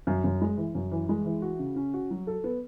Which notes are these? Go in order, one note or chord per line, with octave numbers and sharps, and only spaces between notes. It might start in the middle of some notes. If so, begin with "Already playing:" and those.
F#2
F#2
G#3
E3
F#2
E3
G#3
E3
F#4
C#3
C#4
F#4
F#3
A4
B3